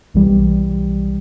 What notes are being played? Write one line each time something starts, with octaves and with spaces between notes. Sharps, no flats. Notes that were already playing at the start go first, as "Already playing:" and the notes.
B1 E3 G3